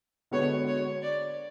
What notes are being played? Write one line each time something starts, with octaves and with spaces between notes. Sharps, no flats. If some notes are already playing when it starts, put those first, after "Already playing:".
D3 G#3 B3 F#4 B4 C#5
C#5
D5